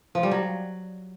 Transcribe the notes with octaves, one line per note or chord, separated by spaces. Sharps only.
F3
G3
F#3